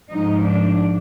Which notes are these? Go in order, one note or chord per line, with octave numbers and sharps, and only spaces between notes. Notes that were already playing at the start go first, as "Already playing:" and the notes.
G#2 F3 D#4
D4